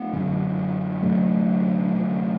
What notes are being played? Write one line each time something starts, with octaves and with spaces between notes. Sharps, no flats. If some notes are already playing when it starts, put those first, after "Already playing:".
Already playing: A3 C4
F#2 D3
D2 C3 F#3 A3
D2 C3